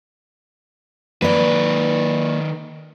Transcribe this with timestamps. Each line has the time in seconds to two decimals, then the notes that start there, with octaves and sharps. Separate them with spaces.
1.22 D#3 A#3 B4 D5